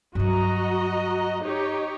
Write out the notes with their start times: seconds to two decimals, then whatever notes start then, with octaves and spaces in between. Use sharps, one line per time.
0.15 G2 F#3 F#4 D#5 A#5
1.42 D#4 G4 C#5